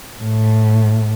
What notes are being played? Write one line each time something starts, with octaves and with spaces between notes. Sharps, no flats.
A2